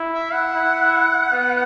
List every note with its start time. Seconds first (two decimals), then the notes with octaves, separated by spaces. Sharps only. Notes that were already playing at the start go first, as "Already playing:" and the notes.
Already playing: E4
0.14 E5
0.33 F#5
0.54 E4
1.33 B3